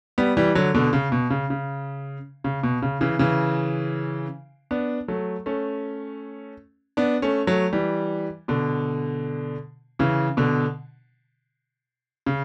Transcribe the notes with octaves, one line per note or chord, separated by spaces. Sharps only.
G3 B3
E3 G3
D3 F#3
B2 D3
C#3
B2
C#3
C#3
C#3
B2
C#3
C#3 E3
C#3 E3
B3 D4
F#3 A3
A3 C#4
B3 D4
A3 C#4
F#3 A3
E3 G3
B2 D3
C#3 E3
B2 D3
C#3